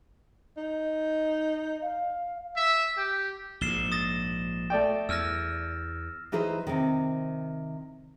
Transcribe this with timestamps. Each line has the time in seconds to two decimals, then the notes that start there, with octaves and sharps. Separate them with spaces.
0.57 D#4
1.82 F5
2.56 E5
2.98 G4
3.61 A#1 G#2 C7 E7 G7
3.92 D#6 A6 A#6
4.70 A3 D5 G5
5.09 E2 E6 F6 A#6
6.32 E3 D#4 G#4 B4 C5
6.67 C3 D#3